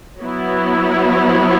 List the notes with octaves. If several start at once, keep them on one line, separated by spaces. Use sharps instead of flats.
F#3 B3 E4